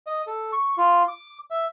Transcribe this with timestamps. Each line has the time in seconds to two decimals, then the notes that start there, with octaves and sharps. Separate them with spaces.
0.07 D#5
0.27 A4
0.52 C#6
0.78 F4
1.08 D6
1.51 E5